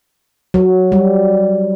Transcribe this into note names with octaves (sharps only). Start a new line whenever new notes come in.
F#3
G3